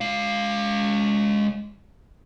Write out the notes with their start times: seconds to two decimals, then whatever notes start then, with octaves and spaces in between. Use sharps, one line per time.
0.01 G#3 F5